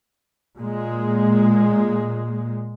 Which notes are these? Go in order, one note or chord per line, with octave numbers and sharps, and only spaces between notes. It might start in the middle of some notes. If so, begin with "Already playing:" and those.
A#2 G#3